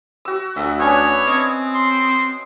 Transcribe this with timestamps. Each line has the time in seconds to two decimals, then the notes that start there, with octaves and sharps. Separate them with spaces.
0.25 F#4 E6
0.57 D2 E5
0.80 B3 C#4 D4 C#5
1.27 C4 D#5
1.75 C6